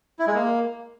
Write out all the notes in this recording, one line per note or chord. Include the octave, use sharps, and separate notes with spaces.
E4
G#3
A#3